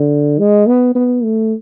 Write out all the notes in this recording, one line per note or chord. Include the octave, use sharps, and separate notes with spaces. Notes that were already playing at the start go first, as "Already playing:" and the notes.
Already playing: D3
G#3
B3
B3
A3